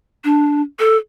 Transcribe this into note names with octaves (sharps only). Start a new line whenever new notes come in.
D4
A4